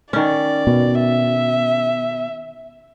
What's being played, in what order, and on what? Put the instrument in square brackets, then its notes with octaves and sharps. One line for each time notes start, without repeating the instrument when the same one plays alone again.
[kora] D#3 C#4 [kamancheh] D5
[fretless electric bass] B2
[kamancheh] E5